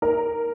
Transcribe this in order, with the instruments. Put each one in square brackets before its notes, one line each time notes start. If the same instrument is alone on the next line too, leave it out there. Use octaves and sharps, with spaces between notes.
[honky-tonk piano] A#4